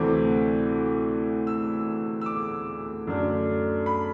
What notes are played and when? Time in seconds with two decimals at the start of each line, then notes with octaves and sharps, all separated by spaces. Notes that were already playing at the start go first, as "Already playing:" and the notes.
Already playing: D2 C3 E3 A3 C4 D6
1.47 E6
2.21 E6
2.26 D6
3.07 F#2 D3 A3 D4
3.86 B5